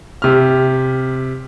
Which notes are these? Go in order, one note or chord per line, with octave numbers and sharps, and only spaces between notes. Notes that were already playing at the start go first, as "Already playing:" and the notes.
C3 F6